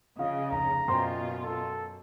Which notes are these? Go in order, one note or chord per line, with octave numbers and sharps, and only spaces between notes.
C#3 F3 D#5 F5
F1 A#5
F#2 B2 F4 C5 G5 C6
A4